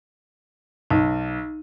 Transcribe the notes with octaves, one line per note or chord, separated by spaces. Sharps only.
B1 D#4